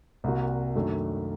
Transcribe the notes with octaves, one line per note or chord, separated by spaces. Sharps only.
C2 C3 G3 A#3 F#4
F#2 D#3 A3 D4